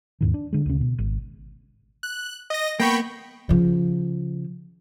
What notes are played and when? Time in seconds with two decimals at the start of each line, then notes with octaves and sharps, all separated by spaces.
0.21 D#2 G#2 D#3
0.34 D4
0.53 D3 G#3
0.66 D2 C#3
0.81 B2
0.99 G#1
2.03 F#6
2.50 D#5 A#6
2.80 A#3 B3 G5 B5 C#6
3.49 C#3 F3